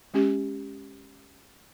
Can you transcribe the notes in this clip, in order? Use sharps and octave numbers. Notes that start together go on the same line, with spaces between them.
G#3 C#4 G4